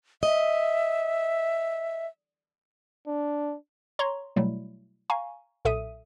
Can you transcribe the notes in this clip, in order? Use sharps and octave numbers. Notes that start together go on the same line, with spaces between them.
D#5 E5
D4
C#5 A#5 C6 C#6
B2 F#3 G3 A3 E4
F5 G#5 A#5 C#6
B1 A#2 A4 E5 D#6 D#7